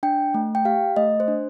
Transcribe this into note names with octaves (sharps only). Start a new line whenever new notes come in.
D4 G5
A3
G5
G4 F5
A3 D#5
C5
D4